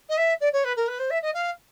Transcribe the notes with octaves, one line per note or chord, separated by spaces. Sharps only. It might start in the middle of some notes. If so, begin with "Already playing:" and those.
D#5
E5
D5
C#5
B4
A#4
B4
C5
E5
D#5
F5